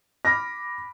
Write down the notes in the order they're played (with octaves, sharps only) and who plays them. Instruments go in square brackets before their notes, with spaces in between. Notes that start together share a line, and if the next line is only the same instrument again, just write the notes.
[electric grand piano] B5 D6 F6 [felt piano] A#6